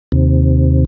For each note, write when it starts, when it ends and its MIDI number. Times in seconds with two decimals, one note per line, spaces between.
0.12 0.85 39
0.12 0.85 48